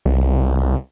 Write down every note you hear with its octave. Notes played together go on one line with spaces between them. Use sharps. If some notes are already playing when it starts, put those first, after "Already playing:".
C2